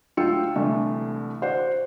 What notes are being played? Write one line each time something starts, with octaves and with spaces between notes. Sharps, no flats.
D2 F#3 F4 G5 E6 C#7
C2 D3 E3 A3
F#4 C5 D5 F#5